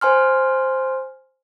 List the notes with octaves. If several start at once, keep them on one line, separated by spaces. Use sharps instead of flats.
C5 G#5 C6 F6